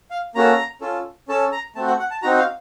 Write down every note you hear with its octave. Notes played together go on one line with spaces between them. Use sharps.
F5
A#3 C#4 F#4 A4 A#5
C#4 F4 A4
C#4 A4 A5
A#5
A3 C4 F#4 A5
F#5
F#5
A5
C4 D#4 F#4 A#5
F5